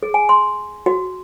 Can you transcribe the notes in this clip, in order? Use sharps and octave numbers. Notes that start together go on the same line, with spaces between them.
G#4
G#5
C6
F#4